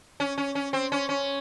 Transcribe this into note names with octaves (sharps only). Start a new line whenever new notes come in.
C#4
C#4
C#4
C4
C#4
C#4